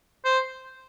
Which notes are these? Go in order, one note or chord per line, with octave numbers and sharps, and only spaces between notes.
C5